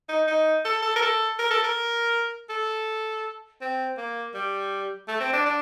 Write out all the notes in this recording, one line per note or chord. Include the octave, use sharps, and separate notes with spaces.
D#4
D#4
A4
A4
A#4
A4
A#4
A4
A#4
A4
C4
A#3
G3
A3
C4
D4
D4